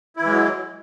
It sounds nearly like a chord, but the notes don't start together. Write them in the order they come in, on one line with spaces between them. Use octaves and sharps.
E4 E3 G#3 F#3